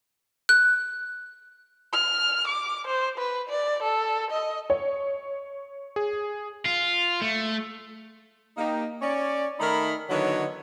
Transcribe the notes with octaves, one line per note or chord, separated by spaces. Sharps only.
F#6
F6
D6
C5
B4
D5
A4
D#5
C#5
G#4
F4
A3
A#3 D#4 G4
C#4 C#5 D5
D#3 A3 D#4 A#4 B5
D3 D#3 F#3 B3 E4 C#5